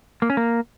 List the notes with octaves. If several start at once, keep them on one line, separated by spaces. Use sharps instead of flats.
A#3
C#4
A#3